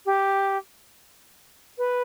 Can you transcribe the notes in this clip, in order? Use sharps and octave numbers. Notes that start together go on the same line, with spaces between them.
G4
B4